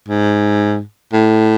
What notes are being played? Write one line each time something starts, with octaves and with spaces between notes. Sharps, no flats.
G#2
A2